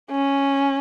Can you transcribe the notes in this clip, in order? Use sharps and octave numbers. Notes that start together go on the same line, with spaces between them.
C#4